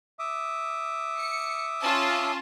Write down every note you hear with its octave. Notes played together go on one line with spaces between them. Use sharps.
E5 D6 D#6
C#7
C#4 F4 A5